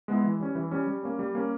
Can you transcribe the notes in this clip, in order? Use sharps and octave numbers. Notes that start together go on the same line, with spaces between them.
G#3 B3 E4
E3
G3 C#4
E3
G3 C#4
G3
A#3 C#4
G3
A#3 C#4